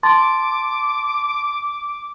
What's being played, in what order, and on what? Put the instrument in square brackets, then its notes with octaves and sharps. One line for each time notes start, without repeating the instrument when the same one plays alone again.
[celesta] A5 C6 A6 [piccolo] D6